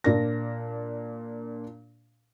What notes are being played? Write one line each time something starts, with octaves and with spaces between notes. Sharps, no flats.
A#2 D4 A#4 A#6